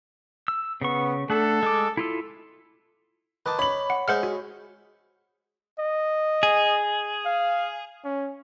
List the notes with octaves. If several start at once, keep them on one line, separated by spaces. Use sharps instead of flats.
E6
C#3 B3 C#6
A3 D4 A4 F#5
G#3 D6
E4 F4 A4
D#3 B4 A5 D6
C#5 B5 F#7
F#5
G#3 C5 E5 F#5 F6
F#4
D#5
G#4
F5
C#4